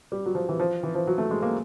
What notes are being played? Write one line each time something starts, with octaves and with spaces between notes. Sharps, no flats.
G3
F#3
F3
E3
F3
E3
F3
F#3
A3
G#3
A#3